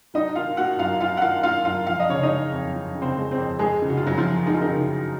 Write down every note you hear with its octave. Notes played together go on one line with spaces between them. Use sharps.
F#3 D#4 D#5
D#3 F4 F5
A#3 F#4 F#5
F#2 F4 F5
F#3 F4 F5
F#5
D#3 F4 F5
A#3 F4 F5
F#2 F4 F5
F3 F5
D#5
C#3 C#5
D#4 D#5
G#3
F2
F3
C#3
C4 C5
G#3
C4 C5
F2
G#3 G#4
C#3
F#4
F4
F#2 F#3 F#4
F3 F4
F#2
G#3 D#4
F4
D#3 D#4
C#3